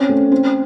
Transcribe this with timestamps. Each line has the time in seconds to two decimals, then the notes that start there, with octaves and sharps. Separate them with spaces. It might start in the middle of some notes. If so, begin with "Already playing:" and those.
Already playing: C4 C#4
0.09 A3
0.32 C4